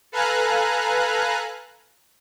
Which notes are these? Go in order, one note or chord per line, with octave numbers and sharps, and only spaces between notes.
A4 B4 F5 G#5 A#5 F#6